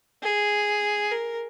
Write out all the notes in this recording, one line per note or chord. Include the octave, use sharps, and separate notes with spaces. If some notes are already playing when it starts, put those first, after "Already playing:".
G#4
A#4